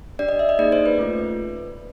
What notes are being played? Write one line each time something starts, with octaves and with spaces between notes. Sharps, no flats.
D4 G4 D5
D#5
E5
D#5
A#3 D#4 G#4 D5
C5
B4
A3 C#4 F4